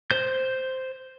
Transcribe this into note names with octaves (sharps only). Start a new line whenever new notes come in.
C5 G6